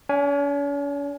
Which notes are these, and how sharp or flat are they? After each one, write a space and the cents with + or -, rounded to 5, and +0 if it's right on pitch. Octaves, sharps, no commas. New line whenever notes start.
C#4 +45 G#5 +0